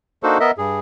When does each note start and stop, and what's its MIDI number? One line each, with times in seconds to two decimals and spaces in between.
0.23 0.38 58
0.23 0.38 62
0.23 0.38 63
0.23 0.38 66
0.23 0.38 69
0.23 0.38 72
0.40 0.51 59
0.40 0.51 70
0.40 0.51 75
0.40 0.51 76
0.58 0.80 43
0.58 0.80 68